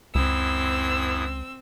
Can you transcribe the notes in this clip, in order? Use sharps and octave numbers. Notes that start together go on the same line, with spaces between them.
C#2 F#2 C4 E4 D#6 E6